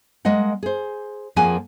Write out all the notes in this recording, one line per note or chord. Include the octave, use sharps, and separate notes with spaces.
G#3 A#3 D#5 F#5
G#4 C5
F2 F3 A#3 G#4 F#5 G#5